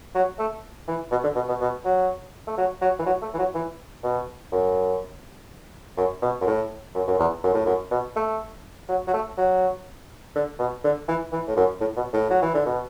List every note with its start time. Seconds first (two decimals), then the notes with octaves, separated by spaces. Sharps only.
0.15 F#3
0.39 A3
0.88 E3
1.11 B2
1.24 D3
1.35 B2
1.48 B2
1.61 B2
1.85 F#3
2.47 A3
2.58 F#3
2.81 F#3
2.99 E3
3.06 F#3
3.22 A3
3.34 E3
3.39 F#3
3.54 E3
4.04 B2
4.52 F#2
5.97 F#2
6.22 B2
6.41 F#2
6.47 A2
6.94 F#2
7.07 F#2
7.19 E2
7.44 F#2
7.54 A2
7.66 F#2
7.91 B2
8.16 A3
8.89 F#3
9.07 F#3
9.13 A3
9.37 F#3
10.35 D3
10.59 B2
10.84 D3
11.08 E3
11.32 E3
11.48 A2
11.56 F#2
11.81 A2
11.97 B2
12.13 A2
12.30 F#3
12.42 E3
12.54 D3
12.66 B2